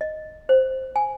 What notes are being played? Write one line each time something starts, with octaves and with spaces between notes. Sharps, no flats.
D#5
C5
G#5